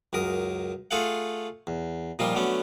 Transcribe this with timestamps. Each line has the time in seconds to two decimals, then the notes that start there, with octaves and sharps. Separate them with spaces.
0.13 C#2 F#2 A#4 D#6
0.91 A3 F4 G#4 A4 F5 F#5
1.67 E2
2.19 A#2 F3 G3 D#4 F4
2.35 D3 F#3 A3 B3 C#4